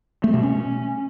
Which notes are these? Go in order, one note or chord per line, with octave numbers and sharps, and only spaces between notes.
A3
B2
C#4